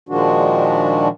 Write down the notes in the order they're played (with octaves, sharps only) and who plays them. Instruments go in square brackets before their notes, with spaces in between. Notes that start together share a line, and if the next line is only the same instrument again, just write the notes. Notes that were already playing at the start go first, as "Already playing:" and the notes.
[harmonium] A#2 D#3 F3 G#3 D4 F#4